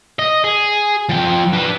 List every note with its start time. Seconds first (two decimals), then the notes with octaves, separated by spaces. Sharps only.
0.19 D#5
0.44 G#4
1.09 F3 G5
1.53 D4 B4